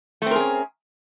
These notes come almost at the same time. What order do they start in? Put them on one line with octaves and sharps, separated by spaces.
A3 C4 A#4 G#4 C#4